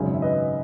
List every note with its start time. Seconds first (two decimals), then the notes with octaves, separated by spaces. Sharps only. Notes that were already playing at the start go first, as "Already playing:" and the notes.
Already playing: G#1 F#2 C#3 G#3
0.14 E5
0.22 B4 D#5